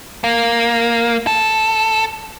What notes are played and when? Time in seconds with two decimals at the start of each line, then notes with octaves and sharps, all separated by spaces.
0.24 A#3
1.27 A4